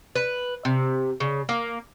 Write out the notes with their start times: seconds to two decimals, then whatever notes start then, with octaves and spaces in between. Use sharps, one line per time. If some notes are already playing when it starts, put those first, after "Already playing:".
0.16 B4
0.65 C3
1.20 C#3
1.49 A#3